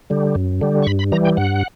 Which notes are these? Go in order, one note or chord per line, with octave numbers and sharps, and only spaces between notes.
D3 G3
F#2
D3 G3
C#6
G2 B5
B5
E3 G3 A#5
G5
G2 F#5